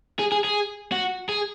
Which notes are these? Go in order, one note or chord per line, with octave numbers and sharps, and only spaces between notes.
G#4
G#4
G#4
F#4
G#4